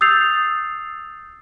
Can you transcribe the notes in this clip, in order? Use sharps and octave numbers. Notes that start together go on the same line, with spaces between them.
D#6 E6 G6 A6 C7 F7